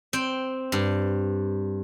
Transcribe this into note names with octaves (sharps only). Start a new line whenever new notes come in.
C4 G5
G2